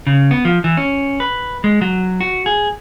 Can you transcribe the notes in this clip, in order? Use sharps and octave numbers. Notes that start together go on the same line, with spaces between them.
C#3
B3
F3
E3
C#4
B4
G#3
F#3
F#4
G#4